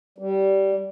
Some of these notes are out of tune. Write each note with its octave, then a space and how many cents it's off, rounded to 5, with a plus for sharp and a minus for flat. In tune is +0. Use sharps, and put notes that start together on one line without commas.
G3 -15